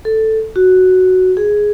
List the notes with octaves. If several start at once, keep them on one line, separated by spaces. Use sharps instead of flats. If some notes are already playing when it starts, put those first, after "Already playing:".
A4
F#4
G#4